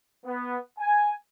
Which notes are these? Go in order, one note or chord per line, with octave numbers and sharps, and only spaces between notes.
B3
G#5